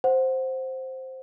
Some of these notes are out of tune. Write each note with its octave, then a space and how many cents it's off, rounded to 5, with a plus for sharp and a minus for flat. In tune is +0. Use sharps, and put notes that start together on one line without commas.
C5 +0 F#5 -5